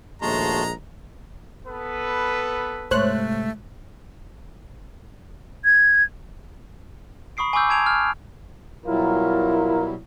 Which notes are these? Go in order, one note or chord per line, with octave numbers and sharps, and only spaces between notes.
A#1 D#2 G#3 A3 F#4 A5 A#5 C6
B3 A4 B4
G#2 C3 A3 C5 C#5 F#6
G#6
A#5 B5 C#6 D#6 C7 D7
G#5 B5 C#6 D6 E6 G6
G#5 A5 G#6 D7 F7
F6
B2 F#3 G3 E4 F4 A#4